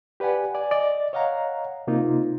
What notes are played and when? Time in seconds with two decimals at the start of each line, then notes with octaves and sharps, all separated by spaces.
0.20 G4 B4 D5 F#5 G#5
0.55 D5 G#5
0.71 D5 D#5
1.13 C#5 D#5 F5 F#5 A#5
1.87 C3 A#3 D#4 F4